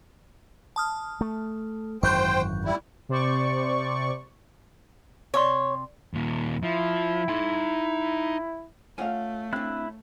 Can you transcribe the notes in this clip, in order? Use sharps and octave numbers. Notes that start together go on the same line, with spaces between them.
A5 D#6 F6
A3
G#1 F#2 E3 C5 G5 C#6 F#6 G6
G3 E4
C3 C5 D5 C#6
C3 C#5 E5 C6
D#2 A#2
F3 E4
D#4 C6
A3 C#4 F4 F5 F#5 G#5
C4 D4 E4 F#6